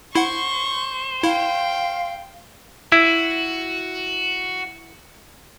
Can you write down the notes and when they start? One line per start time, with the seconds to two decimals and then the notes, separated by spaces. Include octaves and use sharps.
0.15 E4 C5 F#5 C#6
1.23 E4 F5 G5
2.92 E4 F#4